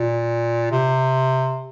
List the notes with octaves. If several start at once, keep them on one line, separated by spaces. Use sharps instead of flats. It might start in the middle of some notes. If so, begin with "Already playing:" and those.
Already playing: A#2
C3